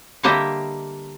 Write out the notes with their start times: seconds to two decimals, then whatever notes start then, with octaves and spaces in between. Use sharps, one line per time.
0.23 D3 G3 A#3 G4 D#5 E5